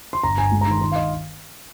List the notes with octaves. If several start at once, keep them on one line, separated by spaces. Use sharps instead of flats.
C6
G1 A#5
G1 G#5
G#3
A#5
D#3 C6
D#3 C6
F5
D#5